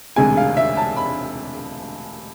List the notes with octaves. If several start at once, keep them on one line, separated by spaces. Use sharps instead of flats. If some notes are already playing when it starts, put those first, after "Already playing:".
E1 D2 C3 G#3 G#5
F5
E5
A5
B5